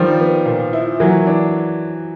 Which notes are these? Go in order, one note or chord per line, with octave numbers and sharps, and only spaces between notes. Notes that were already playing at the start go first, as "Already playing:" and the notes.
Already playing: D#3 F3 G3
B3
A#2
E4
E3 F#3 A#3
D4